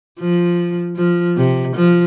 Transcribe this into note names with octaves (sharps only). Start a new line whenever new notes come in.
F3
F3
C3
F3